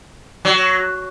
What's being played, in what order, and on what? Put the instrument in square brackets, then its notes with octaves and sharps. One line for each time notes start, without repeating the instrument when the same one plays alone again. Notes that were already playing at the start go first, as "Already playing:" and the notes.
[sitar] F#3